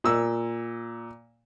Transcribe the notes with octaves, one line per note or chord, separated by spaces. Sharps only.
A#2 E6